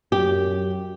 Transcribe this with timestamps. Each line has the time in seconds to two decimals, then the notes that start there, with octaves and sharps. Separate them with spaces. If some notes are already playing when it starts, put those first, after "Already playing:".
0.12 F#2 G4